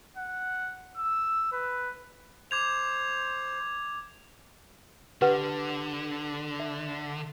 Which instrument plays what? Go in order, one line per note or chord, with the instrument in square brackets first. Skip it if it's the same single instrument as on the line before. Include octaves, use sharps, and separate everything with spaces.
[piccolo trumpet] F#5
E6
B4
[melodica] C5 [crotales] D6 G#6 F7
[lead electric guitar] D3 [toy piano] G4 B4 F#5
[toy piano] E5